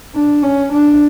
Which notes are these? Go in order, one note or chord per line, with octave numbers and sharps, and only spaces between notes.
D4
C#4
D4